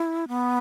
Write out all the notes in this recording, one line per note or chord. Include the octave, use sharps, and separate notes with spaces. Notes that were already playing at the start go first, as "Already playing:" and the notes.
Already playing: E4
B3